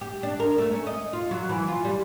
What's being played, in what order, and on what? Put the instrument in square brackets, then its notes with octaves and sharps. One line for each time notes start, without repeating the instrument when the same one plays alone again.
[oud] G4
D4
A#4
A3
C#4
D#5
F4
F#3
E3
F4
G3